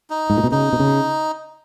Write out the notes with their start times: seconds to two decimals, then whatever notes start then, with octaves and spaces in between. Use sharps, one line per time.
0.10 D#4
0.30 G#2
0.37 A#2
0.44 B2
0.51 C#3 D#4
0.73 B2
0.80 C#3